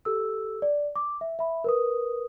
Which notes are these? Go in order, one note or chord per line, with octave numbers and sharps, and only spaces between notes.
G4 A4 E6
D5
D6
E5
E5 B5
A#4 B4 D#6